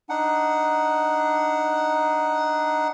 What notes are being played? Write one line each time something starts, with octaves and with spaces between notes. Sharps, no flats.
D4 D#4 F#5